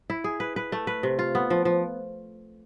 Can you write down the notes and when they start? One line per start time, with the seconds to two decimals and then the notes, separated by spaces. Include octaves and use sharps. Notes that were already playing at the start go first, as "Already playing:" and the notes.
0.10 E4
0.24 G#4
0.40 B4
0.56 B4
0.72 A3
0.87 B4
1.03 C3
1.19 F4
1.35 B3
1.50 F3
1.65 F3